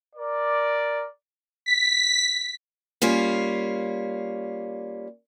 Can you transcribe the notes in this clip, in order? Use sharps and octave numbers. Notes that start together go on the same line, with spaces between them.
A#4 D5
B6
G3 A#3 C#4 F4